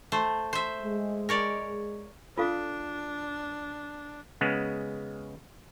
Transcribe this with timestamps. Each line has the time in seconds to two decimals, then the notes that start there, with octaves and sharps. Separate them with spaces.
0.12 A3 C5
0.53 C5 E5
0.82 G#3
1.29 A#4 C#5 D5
2.38 D4 F4 A4 F5
4.41 C#3 G#3 B3